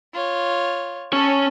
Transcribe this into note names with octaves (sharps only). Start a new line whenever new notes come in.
F4 C#5
C#4 A4 C#5